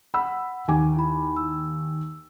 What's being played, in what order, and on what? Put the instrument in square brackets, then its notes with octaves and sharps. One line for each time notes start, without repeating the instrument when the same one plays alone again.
[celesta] F#5 [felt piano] B5 E6
[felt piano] D#2 G#5 D6
[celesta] E4 B5
E6